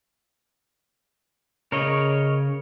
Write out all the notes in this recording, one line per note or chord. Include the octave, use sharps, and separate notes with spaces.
C#3 A#4 C#5 D#5